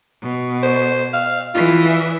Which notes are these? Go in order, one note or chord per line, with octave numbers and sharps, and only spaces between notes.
B2
C5
F5
E3 F4
E5